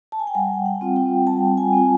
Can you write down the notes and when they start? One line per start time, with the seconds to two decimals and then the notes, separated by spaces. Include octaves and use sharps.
0.12 A5
0.20 G#5
0.27 G5
0.35 G3 F#5
0.66 F#5
0.81 C4 F4
0.96 G5
1.27 G3 A5
1.58 G#5
1.73 C4 F4